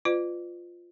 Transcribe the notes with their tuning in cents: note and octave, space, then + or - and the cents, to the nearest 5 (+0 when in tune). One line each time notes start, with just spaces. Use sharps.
F4 +0 B4 +45 D5 +45